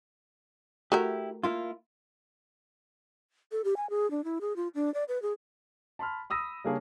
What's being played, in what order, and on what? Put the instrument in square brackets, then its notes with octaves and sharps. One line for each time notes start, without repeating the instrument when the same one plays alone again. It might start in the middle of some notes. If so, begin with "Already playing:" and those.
[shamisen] A3 F#4 A#4 [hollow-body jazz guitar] E4 G4
[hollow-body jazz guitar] A#3 E4 F4
[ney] A4
G4
G#5
G#4
D4
E4
G#4
F4
D4
D5
B4
G#4
[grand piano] A5 B5 C6 F6
B5 D#6 E6 A#6
C#3 G3 A#3 D4 G#4 C#5